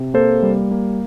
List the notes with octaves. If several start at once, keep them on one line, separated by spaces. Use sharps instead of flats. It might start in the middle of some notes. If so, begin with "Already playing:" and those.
Already playing: C3
A#3 A4 C5
G3
A#3